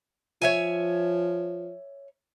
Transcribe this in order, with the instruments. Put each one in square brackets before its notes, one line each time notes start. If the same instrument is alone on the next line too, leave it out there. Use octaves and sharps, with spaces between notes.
[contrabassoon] F3 [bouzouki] C#5 E5 G#5